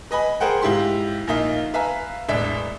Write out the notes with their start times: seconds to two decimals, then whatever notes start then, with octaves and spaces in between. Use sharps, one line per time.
0.11 B4 D#5 G#5 B5
0.40 G#4 A#4 C5 F#5 G5
0.62 G#2 E4 F4 G4 C6
1.27 A#1 A#3 D#4 E5 F5
1.74 B4 E5 F5 G#5 A#5
2.29 E1 A1 D4 E5